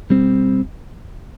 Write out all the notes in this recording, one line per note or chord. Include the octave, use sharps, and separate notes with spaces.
B2 G3 C4